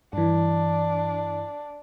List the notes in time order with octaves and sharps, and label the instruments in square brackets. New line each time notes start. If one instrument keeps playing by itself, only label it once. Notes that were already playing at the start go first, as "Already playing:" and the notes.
[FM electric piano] G2 E3 [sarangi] D4